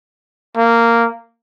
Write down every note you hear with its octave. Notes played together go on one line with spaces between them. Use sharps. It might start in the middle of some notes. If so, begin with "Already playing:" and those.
A#3